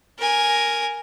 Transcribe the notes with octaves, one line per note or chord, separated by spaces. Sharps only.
A#4 G#5